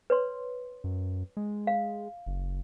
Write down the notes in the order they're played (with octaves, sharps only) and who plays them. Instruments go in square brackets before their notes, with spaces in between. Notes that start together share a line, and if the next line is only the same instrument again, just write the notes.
[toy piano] B4 C#5 C6
[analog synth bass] F#2
G#3
[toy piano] F5
[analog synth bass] F#1